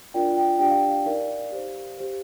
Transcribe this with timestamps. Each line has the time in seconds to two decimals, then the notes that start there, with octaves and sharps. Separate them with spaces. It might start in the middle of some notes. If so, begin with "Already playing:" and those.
0.14 D4 F4 A#4 D5 G5
0.37 G5
0.59 D4 G4 D5 G5
0.71 F5
0.75 G5
0.91 F5
1.05 D#4 A#4 D5 F5
1.52 G4 C5
1.98 G4 C5